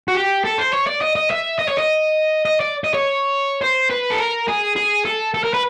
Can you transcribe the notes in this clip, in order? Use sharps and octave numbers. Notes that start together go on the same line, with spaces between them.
F#4
G4
A4
C5
C#5
D5
D#5
D#5
E5
D#5
C#5
D#5
D#5
D5
D#5
C#5
C5
B4
A4
A#4
G#4
G#4
A4
A4
A#4
B4